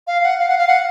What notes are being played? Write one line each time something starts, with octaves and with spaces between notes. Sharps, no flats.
F5
F#5
F5
F#5
F5
F#5